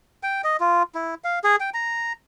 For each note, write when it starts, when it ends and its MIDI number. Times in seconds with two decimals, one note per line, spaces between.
0.23 0.42 79
0.44 0.57 75
0.60 0.83 65
0.95 1.15 64
1.24 1.39 77
1.44 1.56 68
1.60 1.70 79
1.74 2.13 82